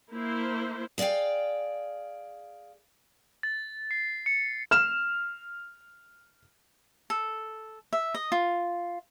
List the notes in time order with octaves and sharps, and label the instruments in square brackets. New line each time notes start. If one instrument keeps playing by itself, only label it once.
[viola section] A#3 E4 C5
[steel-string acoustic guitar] G#4 D5 E5 F5 G5
[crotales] A6
C7
C#7
[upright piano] F6 E7
[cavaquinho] A4
E5
D#5
F4